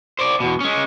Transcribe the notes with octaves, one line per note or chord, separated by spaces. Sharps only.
C5 D5
E2 B2
G#3 C#4